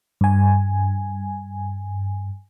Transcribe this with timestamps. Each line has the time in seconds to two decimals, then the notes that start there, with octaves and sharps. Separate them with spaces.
0.21 G2 G#5